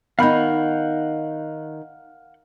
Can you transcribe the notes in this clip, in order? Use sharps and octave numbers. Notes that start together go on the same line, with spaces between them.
D#3 B3 D#4 F5 F#5 B5 G6